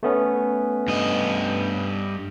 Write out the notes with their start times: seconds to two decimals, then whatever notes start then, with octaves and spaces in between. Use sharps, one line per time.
0.03 A3 B3 C#4
0.88 G2 D#5